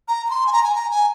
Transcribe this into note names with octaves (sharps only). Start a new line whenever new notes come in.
A#5
A#5
C6
G#5
A#5
G#5
A#5
G#5